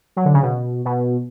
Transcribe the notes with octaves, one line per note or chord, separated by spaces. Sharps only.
F#3
D3
C#3
B2
B2